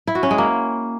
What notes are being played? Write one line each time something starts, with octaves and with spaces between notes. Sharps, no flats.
E4
F#4
C#4
G#3
A#3